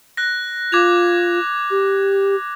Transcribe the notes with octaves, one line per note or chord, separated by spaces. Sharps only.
F#6 A#6
F4 D6 G#6 F7
G4